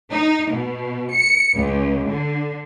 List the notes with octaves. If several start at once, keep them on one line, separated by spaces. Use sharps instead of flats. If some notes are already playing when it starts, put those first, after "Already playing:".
D#4
B2
C#7
C#2
D3